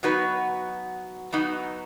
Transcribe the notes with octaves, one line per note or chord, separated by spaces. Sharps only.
F#3 B3 D#4 F#4 B4
F#3 B3 D#4